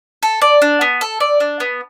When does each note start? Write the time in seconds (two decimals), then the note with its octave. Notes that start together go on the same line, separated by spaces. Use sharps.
0.23 A4
0.42 D5
0.62 D4
0.81 B3
1.01 A4
1.20 D5
1.40 D4
1.60 B3